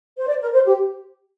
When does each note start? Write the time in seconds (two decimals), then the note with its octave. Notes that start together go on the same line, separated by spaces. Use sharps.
0.18 C5
0.28 D5
0.42 A#4
0.53 C5
0.66 G4